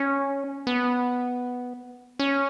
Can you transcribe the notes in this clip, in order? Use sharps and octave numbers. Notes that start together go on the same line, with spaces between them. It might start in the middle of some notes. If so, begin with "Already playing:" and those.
Already playing: C#4
B3
C#4